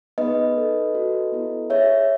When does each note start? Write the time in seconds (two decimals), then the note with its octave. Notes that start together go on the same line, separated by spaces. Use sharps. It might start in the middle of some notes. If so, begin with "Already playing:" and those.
0.18 B3 D#4 G#4 B4 D#5
0.56 D#4 A4
0.93 C#4 F#4 A4
1.32 B3 E4 A4
1.70 C#4 G#4 C#5 E5